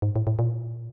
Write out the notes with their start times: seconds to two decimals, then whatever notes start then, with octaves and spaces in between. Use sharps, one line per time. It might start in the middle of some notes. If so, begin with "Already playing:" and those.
0.02 G#2
0.16 A2
0.27 A2
0.39 A#2